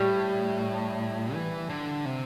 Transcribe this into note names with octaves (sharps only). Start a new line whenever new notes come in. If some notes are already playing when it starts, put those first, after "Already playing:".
Already playing: A2 G3
E3
D3
C3